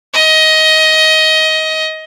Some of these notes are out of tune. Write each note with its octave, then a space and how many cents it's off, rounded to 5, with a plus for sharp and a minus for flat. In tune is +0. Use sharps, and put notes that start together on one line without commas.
D#5 +20